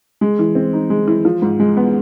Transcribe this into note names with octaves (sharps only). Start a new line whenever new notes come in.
G#3
E3
C4
D#4
G#3
E3
F3
G#2
G#3
B3